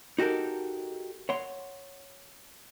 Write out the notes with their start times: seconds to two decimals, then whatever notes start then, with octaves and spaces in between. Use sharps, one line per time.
0.19 D#4 F#4 G4 A4 A#4
1.29 C#5 F#5 C6